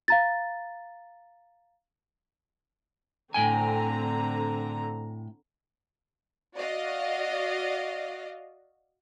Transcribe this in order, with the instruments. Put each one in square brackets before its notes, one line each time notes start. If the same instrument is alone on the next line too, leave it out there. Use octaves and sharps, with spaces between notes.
[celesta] F5 A#5 A6
[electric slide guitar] A2 G5 G#5 [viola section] D3 C4 A#5
[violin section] F#4 D5 D#5 F5